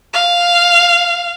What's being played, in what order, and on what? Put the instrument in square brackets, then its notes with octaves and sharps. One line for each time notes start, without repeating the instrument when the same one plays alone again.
[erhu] F5